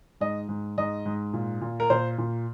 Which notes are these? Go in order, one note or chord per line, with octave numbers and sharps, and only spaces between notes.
G#2 D#5
G#2
G#2 D#5
G#2
A#2
A#2
A#4
A#2 C5
A#2